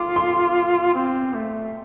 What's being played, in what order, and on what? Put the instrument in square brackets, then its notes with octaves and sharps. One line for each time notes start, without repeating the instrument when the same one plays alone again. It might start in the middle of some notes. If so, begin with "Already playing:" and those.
Already playing: [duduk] F4 [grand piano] D6
[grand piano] C6
[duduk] C4
A3